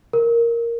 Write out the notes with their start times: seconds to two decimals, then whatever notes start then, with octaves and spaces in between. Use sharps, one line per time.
0.13 A#4